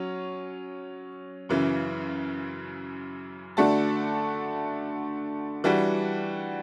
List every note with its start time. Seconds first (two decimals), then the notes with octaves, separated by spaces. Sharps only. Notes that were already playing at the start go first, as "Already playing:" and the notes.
Already playing: F#3 C#4
1.49 F#2 C#3 E3
3.57 D3 A3 D4 F#4 A4
5.64 E3 G3 D4 F#4